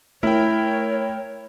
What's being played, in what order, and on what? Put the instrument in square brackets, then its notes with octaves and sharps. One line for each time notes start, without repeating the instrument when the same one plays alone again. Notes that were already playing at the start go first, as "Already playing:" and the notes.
[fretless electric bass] A3 [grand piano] E4 [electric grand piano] A#4 G5 [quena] C#5